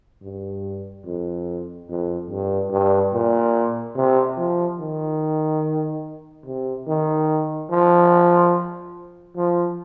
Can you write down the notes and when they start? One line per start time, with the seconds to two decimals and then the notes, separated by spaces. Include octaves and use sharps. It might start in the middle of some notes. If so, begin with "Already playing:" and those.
0.23 G2
1.05 F2
1.89 F2
2.30 G2
2.71 G2
3.13 A#2
3.96 C3
4.37 F3
4.79 D#3
6.46 C3
6.87 D#3
7.70 F3
9.36 F3